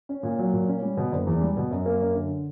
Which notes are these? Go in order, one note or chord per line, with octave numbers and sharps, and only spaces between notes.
C#4
A#2
F#3
A#2
C#4
G3
B2
F#1
E2
G3
B2
F#2
A#3
F#2
D3